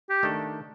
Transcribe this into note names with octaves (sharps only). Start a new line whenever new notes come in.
G4
D#3 A3 D4 A4